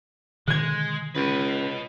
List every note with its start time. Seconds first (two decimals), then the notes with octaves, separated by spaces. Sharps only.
0.48 B2 D3 D#3 G#3 F#6 G#6
1.15 C#2 B4 D#5